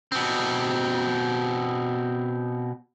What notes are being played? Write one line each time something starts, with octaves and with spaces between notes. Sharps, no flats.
B2 C4